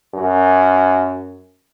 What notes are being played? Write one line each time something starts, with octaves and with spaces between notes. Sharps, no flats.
F#2